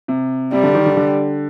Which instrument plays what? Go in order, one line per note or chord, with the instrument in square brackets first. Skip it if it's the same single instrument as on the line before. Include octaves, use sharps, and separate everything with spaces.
[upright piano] C3
[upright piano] C3 [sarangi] G3
[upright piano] D3
D#3
D3
D3